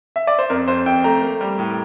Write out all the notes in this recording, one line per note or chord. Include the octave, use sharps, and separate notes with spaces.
E5
D5
C5
F2 A#4
F2 C5
F2 G5
A3 A#5
A#3
G3
A2